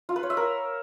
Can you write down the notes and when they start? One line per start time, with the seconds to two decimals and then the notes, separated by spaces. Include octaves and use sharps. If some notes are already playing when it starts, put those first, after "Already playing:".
0.09 F4
0.16 B4
0.23 C#5
0.30 E5
0.37 A#4